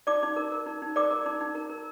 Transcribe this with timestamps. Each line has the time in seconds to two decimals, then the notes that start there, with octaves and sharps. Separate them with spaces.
0.07 D#4 D5 D6
0.23 D#4
0.36 A#4
0.52 A#4
0.66 D#4
0.82 D#4
0.96 A#4 D5 D6
1.11 A#4
1.26 D#4
1.40 D#4
1.55 A#4
1.70 A#4